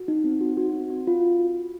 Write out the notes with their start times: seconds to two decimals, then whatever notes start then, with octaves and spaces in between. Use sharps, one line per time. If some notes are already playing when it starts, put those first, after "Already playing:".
Already playing: F#4
0.08 D#4
0.24 C4
0.41 F#4
0.57 F#4
0.74 C4
0.90 F#4
1.07 F4